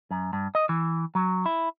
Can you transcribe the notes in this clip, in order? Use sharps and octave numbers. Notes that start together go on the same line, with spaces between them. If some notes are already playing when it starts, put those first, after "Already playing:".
F#2
G2
D#5
E3
F#3
E4